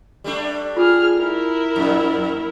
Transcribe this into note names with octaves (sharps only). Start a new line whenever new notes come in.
G3 A3 D4
F4 G#4 A4 F6
E4 A#4
F2 A#2